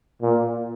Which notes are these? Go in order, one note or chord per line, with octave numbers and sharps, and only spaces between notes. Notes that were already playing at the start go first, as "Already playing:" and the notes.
A#2